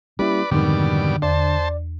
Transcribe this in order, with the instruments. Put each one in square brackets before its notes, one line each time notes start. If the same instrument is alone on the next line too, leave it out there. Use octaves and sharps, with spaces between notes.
[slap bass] G3 A#3 C#4 [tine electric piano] E4 G4 [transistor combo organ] B4 D5
[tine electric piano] F2 G#2 D#3 [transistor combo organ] B2 G3 D5 [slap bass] D3
[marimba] E2 [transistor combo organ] C5 A5 [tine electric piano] D5